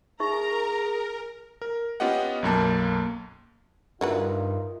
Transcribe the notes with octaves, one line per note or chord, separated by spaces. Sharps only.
D#4 G#4 A#4 E5 A#5 C#6
A#4
B3 C#4 F4 G4 D#5 F#5
B1 F#2 A#3 A5
G2 D3 D#4 F4 F#4 A#4 B4 E5